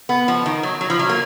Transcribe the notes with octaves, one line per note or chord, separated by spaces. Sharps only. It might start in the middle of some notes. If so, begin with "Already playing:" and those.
B3
F3
D#3
F#3
F#3
F3
F#3
A#3